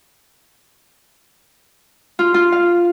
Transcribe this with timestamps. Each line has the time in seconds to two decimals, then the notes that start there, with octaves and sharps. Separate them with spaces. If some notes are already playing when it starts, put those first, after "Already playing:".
2.19 F4
2.34 F4
2.52 F5